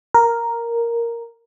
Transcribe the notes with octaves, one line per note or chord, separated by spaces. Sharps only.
A#4